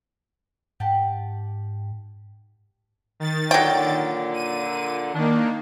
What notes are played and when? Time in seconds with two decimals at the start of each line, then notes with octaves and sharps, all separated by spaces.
0.80 G#2 G4 F#5 A5
3.20 D#3 A6
3.51 A#2 D3 F#3 G5
4.34 D#7
5.14 D#3 A#3 D4